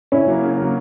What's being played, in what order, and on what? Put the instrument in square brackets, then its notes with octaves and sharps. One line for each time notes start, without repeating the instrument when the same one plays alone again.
[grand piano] C#3 [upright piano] C#4 E4
[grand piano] F#3 A#3
C#3
F#3 A#3